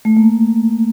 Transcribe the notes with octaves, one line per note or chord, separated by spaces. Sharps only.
A3
A#3